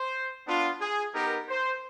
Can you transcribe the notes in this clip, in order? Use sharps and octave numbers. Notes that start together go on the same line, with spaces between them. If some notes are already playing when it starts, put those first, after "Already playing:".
Already playing: C5
B3 D4 F4
G#4
B3 D#4 G4 A#4
C5